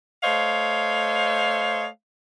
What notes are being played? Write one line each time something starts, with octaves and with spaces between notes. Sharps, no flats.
A3 C5 C#5 D#5 F5